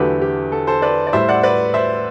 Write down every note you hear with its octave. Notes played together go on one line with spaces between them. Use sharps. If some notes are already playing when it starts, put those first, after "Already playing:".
Already playing: E2 D3 F#3 A3 G4 B4
G4
A4
A4 C5
B4 D5
D5
A2 G3 C5 E5
D5 F#5
B4 D5
C5 E5